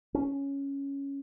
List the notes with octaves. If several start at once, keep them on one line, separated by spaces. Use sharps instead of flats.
C#4